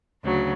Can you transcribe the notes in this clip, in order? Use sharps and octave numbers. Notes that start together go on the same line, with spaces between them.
D2 C#3 F#3